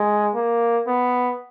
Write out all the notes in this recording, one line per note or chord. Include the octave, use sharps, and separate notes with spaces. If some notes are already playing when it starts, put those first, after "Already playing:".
Already playing: G#3
A#3
B3